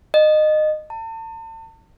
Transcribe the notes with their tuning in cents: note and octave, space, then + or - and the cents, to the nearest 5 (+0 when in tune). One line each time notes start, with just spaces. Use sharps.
D#5 -20
A5 +40